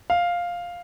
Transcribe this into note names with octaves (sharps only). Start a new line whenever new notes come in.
F5